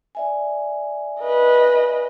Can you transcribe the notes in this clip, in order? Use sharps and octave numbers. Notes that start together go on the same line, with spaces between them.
D5 E5 G#5
B4 D#5